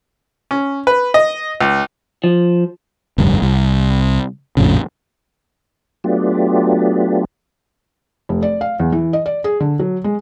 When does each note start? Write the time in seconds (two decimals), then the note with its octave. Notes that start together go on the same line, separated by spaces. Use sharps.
0.51 C#4
0.87 B4
1.14 D#5
1.61 C#2
2.24 F3
3.18 F1 D2 G2
3.42 C2
4.57 A#1 F2 A2 C#3
6.04 F#3 A3 B3 D4 F4 G4
8.29 F1
8.42 D5
8.61 F5
8.80 E2
8.92 E3
9.13 D#5
9.26 D5
9.44 G#4
9.60 D3
9.79 F#3
10.04 G#3